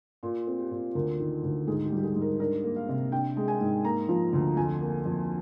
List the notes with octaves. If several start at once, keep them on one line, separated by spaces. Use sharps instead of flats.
A#2 F4
C4
G4
A#2
D2 A#4
D#3
D2
G#2 G#4
G4
G3
G4
G#4
G#2
A#4
D4 A#4
A#3
F5
C3
D4 G5
G#3
G#5
G#2
A#3 A#5
F3
D2
F2 G#5
A#3
F2